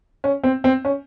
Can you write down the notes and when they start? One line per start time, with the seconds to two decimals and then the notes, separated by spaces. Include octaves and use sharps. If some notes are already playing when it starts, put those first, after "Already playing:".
0.24 C#4
0.43 C4
0.64 C4
0.85 C#4